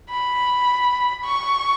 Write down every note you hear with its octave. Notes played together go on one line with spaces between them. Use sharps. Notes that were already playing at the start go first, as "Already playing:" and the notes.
B5
C#6